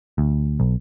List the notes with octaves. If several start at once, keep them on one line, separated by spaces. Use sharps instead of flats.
D2
B1